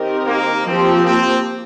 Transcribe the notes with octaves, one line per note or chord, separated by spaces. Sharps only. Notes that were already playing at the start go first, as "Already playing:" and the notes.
Already playing: D#3 C4 D#4 G4 A#4
A#3
F3 A#3 C4 G4
C4